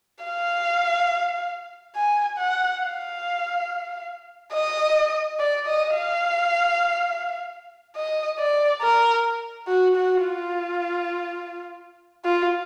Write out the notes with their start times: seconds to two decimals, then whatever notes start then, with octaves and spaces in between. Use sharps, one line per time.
0.24 F5
1.96 G#5
2.38 F#5
2.81 F5
4.53 D#5
5.39 D5
5.67 D#5
5.96 F5
7.96 D#5
8.39 D5
8.82 A#4
9.67 F#4
9.96 F#4
10.24 F4
12.25 F4